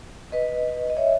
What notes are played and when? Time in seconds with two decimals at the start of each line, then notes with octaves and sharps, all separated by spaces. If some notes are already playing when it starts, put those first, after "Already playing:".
0.32 B4 D#5
0.90 D#5
0.97 C#5 E5